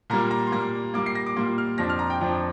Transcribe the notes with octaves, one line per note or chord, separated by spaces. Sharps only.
A#2 G3 A#3 A#5
A#5
C6
A#2 G3 A#3 A#5
A#2 G3 A#3 D6
C7
A#6
D6
A#2 G3 A#3 C6
F6
F2 F3 D4 A#6
F6
A#5
G5
F2 F3 D4